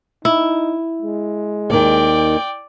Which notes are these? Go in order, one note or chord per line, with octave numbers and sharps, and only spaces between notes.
D#4 E4
G#3
D#2 D#3 D5 G5